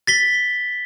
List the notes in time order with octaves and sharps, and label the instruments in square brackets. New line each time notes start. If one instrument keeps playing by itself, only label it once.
[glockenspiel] A6 B6 G7